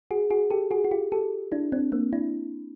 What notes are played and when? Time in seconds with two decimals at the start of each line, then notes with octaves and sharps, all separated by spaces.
0.11 F#4 G#4
0.30 F#4 G#4
0.50 G4 A4
0.71 F#4 G#4
0.84 F#4
0.91 F4 G4
1.12 G4 A4
1.52 D4 E4
1.72 C4 D4
1.92 A#3 C4
2.13 D4 E4